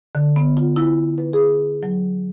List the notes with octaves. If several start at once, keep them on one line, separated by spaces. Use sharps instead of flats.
D3
B3
F4
E4
B4
G#4
F#3